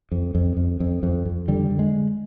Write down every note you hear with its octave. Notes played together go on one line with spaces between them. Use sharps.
F2
F2
F2
F2
F2
F2
D3 G3
D3
G#3